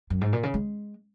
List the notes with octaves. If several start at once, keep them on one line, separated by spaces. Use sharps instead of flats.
F#2
G#2
A#2
C#3
G#3